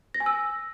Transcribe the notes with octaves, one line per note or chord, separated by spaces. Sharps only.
A#6
G#5
E6